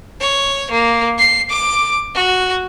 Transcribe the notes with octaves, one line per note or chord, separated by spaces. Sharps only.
C#5
A#3
C7
D6
F#4